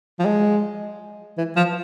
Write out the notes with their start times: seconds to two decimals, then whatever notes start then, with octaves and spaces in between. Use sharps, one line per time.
0.20 F3
0.25 G#3
1.38 E3
1.57 F3